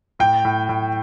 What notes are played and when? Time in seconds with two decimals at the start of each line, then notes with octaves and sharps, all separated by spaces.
0.19 A2 G5
0.45 A2
0.69 A2